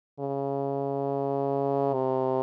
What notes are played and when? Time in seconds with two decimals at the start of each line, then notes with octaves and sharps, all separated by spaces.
0.20 C#3
1.93 C3